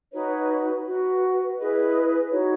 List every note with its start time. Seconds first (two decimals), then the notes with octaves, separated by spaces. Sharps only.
0.12 D#4 F#4 B4 C#5
0.85 F#4 B4
1.58 E4 G#4 B4 D#5
2.31 D#4 F#4 C#5